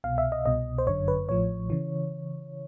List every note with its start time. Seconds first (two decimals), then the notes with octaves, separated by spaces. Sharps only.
0.04 C2 B2 F5
0.18 E5
0.32 D#5
0.46 C2 B2 D#5
0.78 C5
0.87 G1 F#2 D3 C#5
1.08 B4
1.29 A1 A2 F3 C#5
1.70 C#3 E3